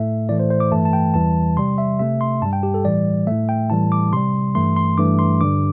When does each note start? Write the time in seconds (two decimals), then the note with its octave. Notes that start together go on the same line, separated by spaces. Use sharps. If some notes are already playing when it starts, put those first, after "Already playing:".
Already playing: A2 A3 E5
0.29 A2 E3 A3 D5
0.40 C5
0.50 C5
0.60 D6
0.71 G2 E3 A3 A5
0.85 A5
0.93 G5
1.14 E2 E3 G3 A5
1.57 C3 G3 C6
1.78 E5
1.99 C3 A3 E5
2.21 C6
2.42 G2 G3 A5
2.53 G5
2.63 G4
2.74 A4
2.85 A2 E3 G3 D5
3.27 A2 A3 E5
3.49 G5
3.70 A2 E3 G3 A5
3.92 D6
4.13 C3 G3 C6
4.55 G2 E3 A3 C6
4.76 C6
4.98 G2 E3 A3 D6
5.19 C6
5.40 G2 D3 G3 D6